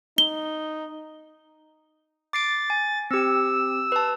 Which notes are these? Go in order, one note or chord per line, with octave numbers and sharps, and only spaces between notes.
D#4 G7
D6 A6 C7 D7
G#5
C4 G4 E6
B4 A5